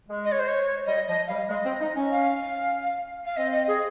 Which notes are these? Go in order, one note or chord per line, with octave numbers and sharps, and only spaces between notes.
G#3
D#5
C#5
C5
C#5
G3 D#5
F3 D#5
G3 F5
G#3 D#5
C4
D#4
C#4
F5
F5
C4 D#5
D#5
G#4